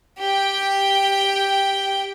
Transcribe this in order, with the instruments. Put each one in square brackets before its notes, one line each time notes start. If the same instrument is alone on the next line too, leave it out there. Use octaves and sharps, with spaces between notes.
[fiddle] G4 G5